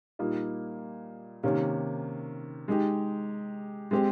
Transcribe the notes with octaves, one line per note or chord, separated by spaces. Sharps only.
A#2 G3 A#3 D#4
C3 D#3 A#3 C#4
G#3 D#4 G4
G#3 C4 G4